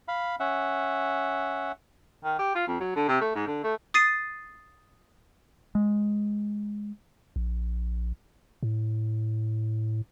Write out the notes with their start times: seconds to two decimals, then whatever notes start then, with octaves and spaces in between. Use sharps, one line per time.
0.08 F5 B5
0.40 C#4 E5 F#5
2.24 D#3
2.39 G4
2.55 F4
2.67 F2
2.80 F#3
2.96 D3
3.08 C3
3.21 A3
3.35 G#2
3.47 D3
3.63 A3
3.94 D#6 A6 C7 D#7
5.75 G#3
7.36 A#1
8.63 A2